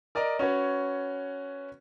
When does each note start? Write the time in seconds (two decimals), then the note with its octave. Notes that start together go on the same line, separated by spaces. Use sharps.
0.15 A#4 D5 D#5 A#5
0.39 C#4 F#4 B4 C#5